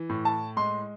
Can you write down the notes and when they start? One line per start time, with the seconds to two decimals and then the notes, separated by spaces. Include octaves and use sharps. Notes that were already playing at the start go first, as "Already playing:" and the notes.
Already playing: E3
0.09 A2
0.25 A5
0.56 G#3 C6